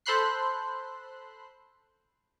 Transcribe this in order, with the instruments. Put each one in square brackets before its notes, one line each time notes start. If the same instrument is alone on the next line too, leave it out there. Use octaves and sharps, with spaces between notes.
[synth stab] A4 C5 B5 C6 F#6 C7